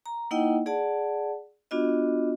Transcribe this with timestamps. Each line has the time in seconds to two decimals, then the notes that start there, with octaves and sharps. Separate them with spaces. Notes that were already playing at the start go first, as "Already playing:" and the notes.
0.06 A#5
0.31 A#3 D#4 E4 D#5 F#5 G5
0.66 G#4 D5 F#5 A5
1.71 B3 D4 F4 F#4 D#5